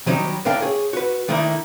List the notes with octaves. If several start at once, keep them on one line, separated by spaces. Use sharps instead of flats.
D#3 F#3 G3 D4 D#4
A2 D3 A#4 F5 G5 A5
G#4 C#5
F#4 B4
D3 D#3 A3 A#3 D#4 E4